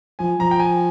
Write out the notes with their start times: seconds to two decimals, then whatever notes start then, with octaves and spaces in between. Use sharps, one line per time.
0.19 F3 G#5
0.39 F3 A#5
0.51 G5
0.59 G#5